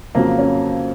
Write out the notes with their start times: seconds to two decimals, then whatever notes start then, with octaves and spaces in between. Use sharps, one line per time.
0.15 F2 C#3 F#3 A#3
0.39 C#4